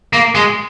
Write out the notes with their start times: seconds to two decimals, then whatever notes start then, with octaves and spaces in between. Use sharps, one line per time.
0.13 A#3
0.35 G#3